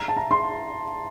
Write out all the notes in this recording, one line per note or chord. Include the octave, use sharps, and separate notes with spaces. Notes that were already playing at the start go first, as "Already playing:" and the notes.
Already playing: A#5
A5
A#5
C6